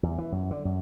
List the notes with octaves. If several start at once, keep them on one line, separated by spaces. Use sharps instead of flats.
E2
E3
F#2
D3
F#2